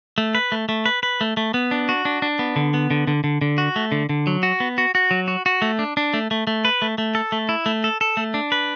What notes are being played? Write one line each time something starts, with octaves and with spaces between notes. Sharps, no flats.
A3
B4
A3
A3
B4
B4
A3
A3
B3
D4
F#4
D4
D4
B3
D3
B3
D3
D3
D3
D3
F#4
A3
D3
D3
F#3
F#4
B3
F#4
F#4
F#3
F#4
F#4
A3
D4
D4
A3
A3
A3
B4
A3
A3
A4
A3
E4
A3
A4
A4
A3
D4
B4